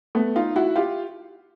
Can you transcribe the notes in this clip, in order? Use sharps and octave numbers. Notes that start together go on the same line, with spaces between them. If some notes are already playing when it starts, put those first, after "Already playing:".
A3 B3
D#4 F4
E4 F#4
F4 G4